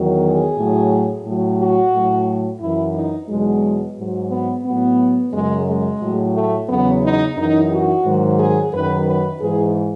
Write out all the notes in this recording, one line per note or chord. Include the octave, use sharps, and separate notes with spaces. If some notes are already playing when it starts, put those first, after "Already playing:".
Already playing: E2 D#3 F#3
G#4
A2 F#3
A2 F#3
F#4
A2 F#3
F#2 E3 E4
D#4
E2 B2 F#3 G#3
G#2 F#3
B3
A2 F#3 B3
F#2 C#3 F#3 G#3
G#3
A2 F#3
A3
E2 C#3 F#3 B3
D#4
F#2 E3 D#4
F#4
G#2 D#3 F#3
G#4
F#2 D#3 F#3 B4
B4
G#2 E3 G#4